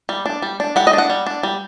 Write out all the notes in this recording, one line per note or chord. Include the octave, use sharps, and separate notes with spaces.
G3
D4
G3
D4
G3 F#5
D#5
D4
F#5
G3
D4
G3